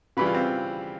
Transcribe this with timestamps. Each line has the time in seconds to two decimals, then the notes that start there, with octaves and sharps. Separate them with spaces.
0.17 C#3 E3 G3 B4
0.26 F4
0.34 C4